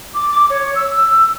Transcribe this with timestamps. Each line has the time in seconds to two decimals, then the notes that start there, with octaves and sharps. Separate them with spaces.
0.15 D6
0.30 D6
0.50 C#5
0.75 E6